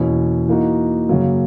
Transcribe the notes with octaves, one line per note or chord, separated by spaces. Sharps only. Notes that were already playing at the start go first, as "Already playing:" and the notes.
Already playing: E2 B2 A#3 C#4 E4
E3 A#3 D#4 F#4
F#2 C#3 F#3 A#3